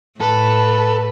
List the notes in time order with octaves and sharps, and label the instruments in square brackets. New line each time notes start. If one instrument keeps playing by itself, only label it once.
[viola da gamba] A2 [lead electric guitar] A4 [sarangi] B4